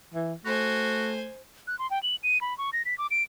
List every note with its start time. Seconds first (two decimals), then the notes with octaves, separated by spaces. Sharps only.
0.14 E3
0.46 A3 F#4 C5 G#5
1.67 F#6
1.79 C6
1.91 G5
2.03 F#7
2.23 D#7
2.41 B5
2.58 C#6
2.73 A#6
2.85 B6
2.98 D6
3.11 D7